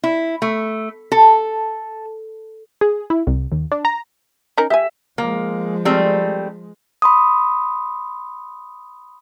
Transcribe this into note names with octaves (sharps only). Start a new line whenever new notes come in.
E4
A3
A4
G#4
E4
C2
D#2
D4
A#5
C#4 D#4 A#4
G4 E5 G#5
F3 G#3 A#3
G3 A3 C4
B5 C6 D#6